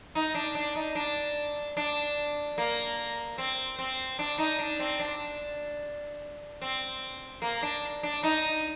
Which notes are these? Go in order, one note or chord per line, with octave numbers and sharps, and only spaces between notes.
D#4
D4
D4
D#4
D4
D4
A#3
C4
C4
D4
D#4
D4
C4
D4
C4
A#3
D4
D4
D#4